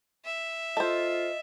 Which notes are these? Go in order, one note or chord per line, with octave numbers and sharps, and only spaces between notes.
E5
F4 A4 C5 D#5